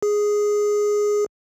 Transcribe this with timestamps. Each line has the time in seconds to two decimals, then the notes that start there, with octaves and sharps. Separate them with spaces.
0.03 G#4